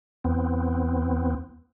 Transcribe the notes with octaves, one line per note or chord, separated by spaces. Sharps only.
E2 B3 C4